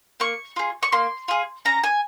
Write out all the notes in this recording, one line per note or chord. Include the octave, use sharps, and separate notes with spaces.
A#3 C#6
F4 G#4
C#6
A#3 C6
F4 G#4
C#4 A#5
G#5